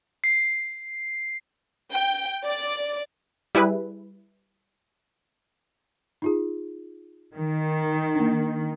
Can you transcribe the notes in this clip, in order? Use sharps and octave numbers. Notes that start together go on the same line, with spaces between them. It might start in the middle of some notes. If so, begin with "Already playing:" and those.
C7
G5
D5
G3 E4 G#4 B4
D#4 F4 G#4
D#3
A#3 D4